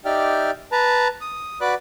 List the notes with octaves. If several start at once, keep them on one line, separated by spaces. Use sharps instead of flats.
D#4 G4 D5 E5 G5 F6
B4 A5 A#5
D#6
F#4 B4 D5 B5 D6 F#6